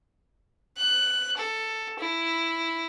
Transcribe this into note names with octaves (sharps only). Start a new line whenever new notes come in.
F#6
A4
E4